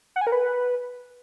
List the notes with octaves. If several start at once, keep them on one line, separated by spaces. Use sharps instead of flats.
F#5
G#5
A#4
B4